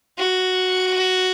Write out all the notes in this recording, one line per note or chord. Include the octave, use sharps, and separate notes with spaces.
F#4